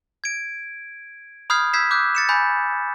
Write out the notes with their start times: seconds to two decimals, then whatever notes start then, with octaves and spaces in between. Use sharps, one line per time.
0.24 G#6 D7
1.50 B5 D#6 F6 G6 G#6 C7
1.73 E6 G6 G#6 B6 C7 E7
1.91 D6 E6 F#6 G6
2.15 A6 C#7 E7
2.29 G#5 B5 G6 A6